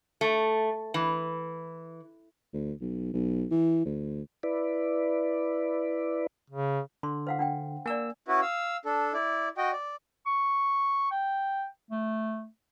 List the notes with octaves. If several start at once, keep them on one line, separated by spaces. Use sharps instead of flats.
A3
E3
D2
B1
B1
E3
D2
E4 B4 D5
C#3
D3 C6
C5 F5 F#5
D4 F#5 G5
A#3 D5 G#5 E6
C#4 E4 F#4 B4
F5 E6
D4 A4
E4 D5
F#4 D#5 G5
D5
C#6
G5
A3